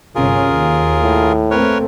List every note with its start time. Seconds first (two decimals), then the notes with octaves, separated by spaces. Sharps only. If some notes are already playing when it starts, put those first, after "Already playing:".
0.15 G1 C3 C#4 F4 G#4 A#4
0.48 D#2
1.03 A2
1.51 A3 A#3 C4 A#4 B4 C#5